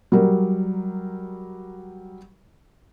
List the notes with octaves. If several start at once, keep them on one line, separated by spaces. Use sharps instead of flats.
F#3 G3 A#4